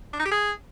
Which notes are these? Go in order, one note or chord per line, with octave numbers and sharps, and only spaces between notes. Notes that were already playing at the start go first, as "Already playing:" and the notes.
D4
D#4
G4
G#4